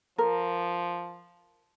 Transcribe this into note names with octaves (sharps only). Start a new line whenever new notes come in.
F3 A#4